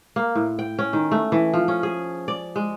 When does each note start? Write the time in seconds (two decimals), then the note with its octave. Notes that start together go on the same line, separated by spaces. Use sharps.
0.16 A#3
0.35 A2
0.59 G5
0.79 C#4
0.93 D#3
1.12 A3
1.32 E3
1.54 F3
1.68 C#4
1.83 G#4
2.28 D5
2.56 G#3